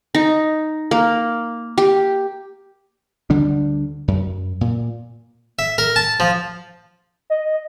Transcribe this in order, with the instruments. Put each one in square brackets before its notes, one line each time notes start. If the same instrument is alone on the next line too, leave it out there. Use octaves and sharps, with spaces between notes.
[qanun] D#4
A#3
G4
[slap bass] D2 D3 G3 D4
F#2
A#2
[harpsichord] E5
A#4
A5
F3
[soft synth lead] D#5